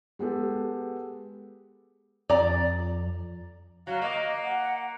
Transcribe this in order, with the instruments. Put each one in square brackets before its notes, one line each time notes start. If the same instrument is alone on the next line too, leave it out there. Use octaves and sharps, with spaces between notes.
[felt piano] G#3 B3 G4 A4
[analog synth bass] F2 [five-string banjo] D5 A#5
[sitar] F#3 [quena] F5
[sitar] A#3 [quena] D#5
[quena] F#5